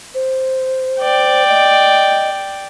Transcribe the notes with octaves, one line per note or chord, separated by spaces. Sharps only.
C5
D5 G5
D#5